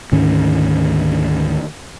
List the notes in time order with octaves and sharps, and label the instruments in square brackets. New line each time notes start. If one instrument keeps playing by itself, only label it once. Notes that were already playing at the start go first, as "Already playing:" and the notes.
[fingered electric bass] D2 G#2 D#3 C#4